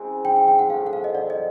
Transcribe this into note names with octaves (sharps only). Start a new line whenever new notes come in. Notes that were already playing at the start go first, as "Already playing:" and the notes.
Already playing: C#3 E3 G#3 C4
G5
G5
G5
F#5
A2 F3 A3 F5
F#5
F5
D#5
D5
D#5